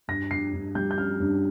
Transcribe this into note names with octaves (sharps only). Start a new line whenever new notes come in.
G2 A#6
G2 C7
G2
G3 G6
G6
C#4 F6
G2